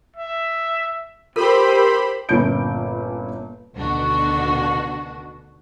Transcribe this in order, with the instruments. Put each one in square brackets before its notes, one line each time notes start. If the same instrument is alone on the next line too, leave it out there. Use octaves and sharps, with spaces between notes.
[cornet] E5
[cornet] C4 [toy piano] F4 A4 A#4 [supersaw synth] G4 C5 B5
[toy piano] A#4
[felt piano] G1 A#2 A#3 C#4 G6 D7
[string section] D2 B2 D#3 D4 F#4